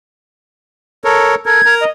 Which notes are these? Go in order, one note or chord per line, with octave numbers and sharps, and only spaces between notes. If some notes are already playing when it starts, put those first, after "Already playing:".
A4 A#4 C#5
A4 A#4 G#6
A#4 A#5
D#5